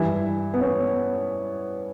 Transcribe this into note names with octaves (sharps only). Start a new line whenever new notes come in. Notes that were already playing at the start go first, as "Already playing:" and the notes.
Already playing: G2 E3 E4
B3
C#4